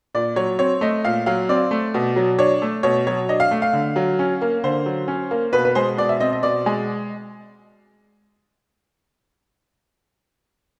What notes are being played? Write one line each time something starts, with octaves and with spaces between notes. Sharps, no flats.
A#2 D5
F#3 C#5
C4 C#5
A3 D#5
A#2 F5
F#3 F5
C4 D5
A3
B2
F#3
D4 C#5
A3
B2 C#5
F#3 C#5
D4 D#5
F5
A3
F5
D3
F#3
C#4
A#3
D3 C5
F#3
C#4
A#3
B2 B4
B4
G#3 C5
B2 D5
E5
C4 D#5
D#5
B2 D5
G#3